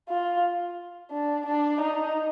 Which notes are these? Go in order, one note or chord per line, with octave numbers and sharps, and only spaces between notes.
F4
D4
D4
D#4